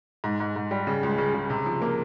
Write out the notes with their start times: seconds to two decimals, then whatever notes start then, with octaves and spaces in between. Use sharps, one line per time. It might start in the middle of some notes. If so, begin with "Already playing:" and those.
0.24 G#2
0.40 G#2
0.56 G#2
0.71 G3
0.87 C#3
1.03 C#2
1.18 C#3
1.34 C#3
1.50 C3
1.66 F3
1.82 A#3